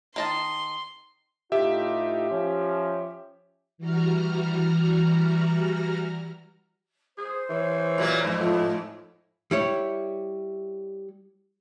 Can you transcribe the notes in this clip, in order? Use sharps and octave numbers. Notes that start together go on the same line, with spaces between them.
D#3 D#5 A5 C6
A2 D#4 F4 G4 E5
F3 C#4
E3 G3 F#4 A#5 F6
G#4 C5
E3 C#5
A#2 F#3 A#3
F2 G#2
A2 F3
G3 E4 C#5